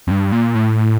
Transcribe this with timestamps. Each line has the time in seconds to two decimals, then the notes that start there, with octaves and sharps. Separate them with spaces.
0.07 F2
0.11 G2
0.32 A#2
0.55 A2